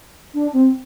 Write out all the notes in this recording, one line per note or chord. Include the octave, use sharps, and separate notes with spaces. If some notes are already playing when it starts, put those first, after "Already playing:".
D4
C4